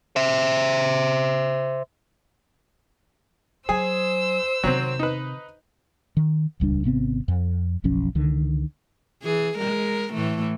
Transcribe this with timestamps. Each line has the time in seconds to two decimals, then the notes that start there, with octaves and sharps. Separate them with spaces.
0.16 C5 E5
3.69 F#3 G#4 C5 G#5 E6
4.63 C3 D#3 F#3 C4
4.99 D#4 B4
6.17 D#3
6.60 D#1 C#2 G3 D4
6.84 G#1 C3 B3 C4
7.28 F2
7.84 F#1 B1 F3 C#4
8.15 C#2 D3 D#3
9.23 E3 G#4
9.57 G#3 A#4
10.13 A2 E3 A3